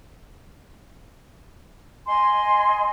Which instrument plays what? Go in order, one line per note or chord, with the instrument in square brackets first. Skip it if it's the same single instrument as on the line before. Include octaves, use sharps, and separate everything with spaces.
[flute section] D#5 G#5 C6